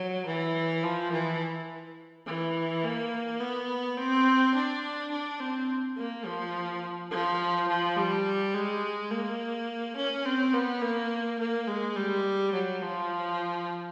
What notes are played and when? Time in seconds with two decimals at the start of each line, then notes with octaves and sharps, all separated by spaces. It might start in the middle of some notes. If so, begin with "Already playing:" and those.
Already playing: F#3
0.27 E3
0.83 F3
1.12 E3
2.26 E3
2.84 A#3
3.40 B3
3.97 C4
4.54 D4
5.11 D4
5.40 C4
5.97 A#3
6.26 F3
7.11 F3
7.68 F3
7.97 G3
8.54 G#3
9.11 A#3
9.96 C#4
10.25 C4
10.53 B3
10.82 A#3
11.39 A#3
11.67 G#3
11.96 G3
12.53 F#3
12.82 F3